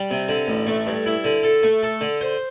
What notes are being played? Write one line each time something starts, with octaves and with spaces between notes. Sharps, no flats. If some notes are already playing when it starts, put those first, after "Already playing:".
Already playing: G3
C3
D3
A1
A3
G2
E4
D3
A4
A3
A4
D3
C5